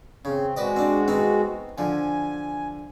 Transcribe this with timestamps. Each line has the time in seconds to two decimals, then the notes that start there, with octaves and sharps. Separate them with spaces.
0.25 C#3 C4
0.57 G#3 F#4 B4 D5 D#5
0.76 C4 D4
1.08 B3 C4 D#4
1.78 D3 F3 G#5